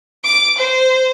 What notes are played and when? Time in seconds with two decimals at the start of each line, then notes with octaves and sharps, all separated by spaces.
0.24 D6 D7
0.57 C5